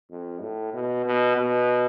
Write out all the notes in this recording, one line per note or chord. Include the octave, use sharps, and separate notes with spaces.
F2
A2
B2
B2
B2